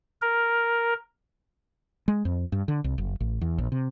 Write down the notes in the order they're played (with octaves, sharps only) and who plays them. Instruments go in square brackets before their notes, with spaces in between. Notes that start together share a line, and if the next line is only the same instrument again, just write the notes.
[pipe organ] A#4
[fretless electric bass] G#3
F2
G2
D3
C2
F#1
A1
E2
A#1
C3